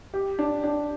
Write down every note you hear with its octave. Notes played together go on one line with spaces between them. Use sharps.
G4
D4
D4